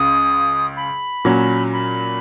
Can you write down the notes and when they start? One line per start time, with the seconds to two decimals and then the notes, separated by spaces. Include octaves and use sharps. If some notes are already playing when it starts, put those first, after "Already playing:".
Already playing: C#2 C#3 D#6
0.77 B5
1.25 A#2 F#3 C#4
1.73 B5